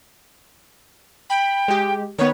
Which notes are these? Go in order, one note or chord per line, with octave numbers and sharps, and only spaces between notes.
G5 B5
G#3 G4
D#3 B3 C#5